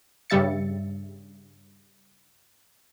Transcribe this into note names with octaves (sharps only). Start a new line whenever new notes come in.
G2 C#3 G3 E5 A6 C#7